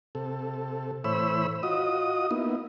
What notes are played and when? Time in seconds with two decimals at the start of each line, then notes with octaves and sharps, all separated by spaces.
0.15 C3 A4
1.04 A2 E3 C5 C#5 B5 E6
1.63 F4 F#4 D#5 D#6
2.31 A#3 B3 D#4 E4